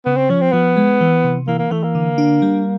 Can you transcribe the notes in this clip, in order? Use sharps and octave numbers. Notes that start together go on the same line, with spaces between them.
C#3 B3
C4
F3 C#4
C4
F3 B3
G#3
E3
C3
E3 A#3
A#3
E3 A3
A#3
D3
D4
G3